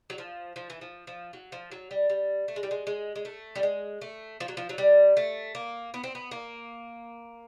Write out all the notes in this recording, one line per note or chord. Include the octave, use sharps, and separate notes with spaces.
F#3
F3
F3
E3
F3
F3
F#3
F3
F#3
G3
G3
A3
G#3
G3
G#3
G#3
G#3
A3
G3
G#3
A3
F3
F#3
F3
F#3
G3
A3
A#3
B3
C4
B3
A#3